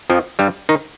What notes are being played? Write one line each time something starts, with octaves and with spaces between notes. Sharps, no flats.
F2 F3
G2 G3
D#3 D#4